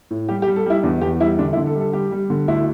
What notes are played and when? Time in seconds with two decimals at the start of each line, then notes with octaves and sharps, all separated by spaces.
0.10 A2
0.29 G3 G4
0.42 G4
0.47 G3
0.56 A4
0.66 G3 E4
0.83 E2 D4
1.02 E2 G4
1.20 G3 E4
1.39 D3 D4
1.53 E4
1.57 D3
1.66 A4
1.75 G3
1.80 A4
1.93 G3 G4
2.12 G3
2.30 D3
2.48 D2 E4